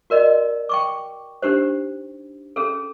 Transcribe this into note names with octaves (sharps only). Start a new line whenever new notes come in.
F#4 A#4 D5 D#5
G5 C#6 D6
D4 D#4 G4 C5
C#4 G#4 A4